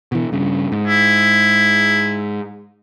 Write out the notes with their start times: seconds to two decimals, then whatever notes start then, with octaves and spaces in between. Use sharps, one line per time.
0.12 B2 E3
0.32 G2 C#3
0.72 G#2
0.87 E4